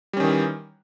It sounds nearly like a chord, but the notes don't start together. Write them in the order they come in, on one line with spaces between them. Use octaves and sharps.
G3 C#4 D#3 E3